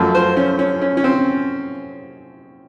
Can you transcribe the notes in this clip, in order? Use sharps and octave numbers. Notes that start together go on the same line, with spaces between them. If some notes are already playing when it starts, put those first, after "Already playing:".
Already playing: F#2 F3 A3
C5
C#4
C#4
C#4
C#4
C4